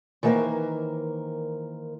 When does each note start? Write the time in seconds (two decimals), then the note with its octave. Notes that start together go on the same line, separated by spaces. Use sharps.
0.23 D#3 E3 A#3 A4 A#4 C5